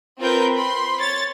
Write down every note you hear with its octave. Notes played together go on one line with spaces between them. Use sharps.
C4 F4 A#4 B4 G6
B5 C6
C#5 A6